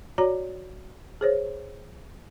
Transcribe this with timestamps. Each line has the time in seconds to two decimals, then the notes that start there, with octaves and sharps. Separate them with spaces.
0.18 F#4 C#5 D5 A#5
1.21 G#4 C5 C#5